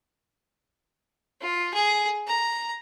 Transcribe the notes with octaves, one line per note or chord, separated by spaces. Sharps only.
F4
G#4
A#5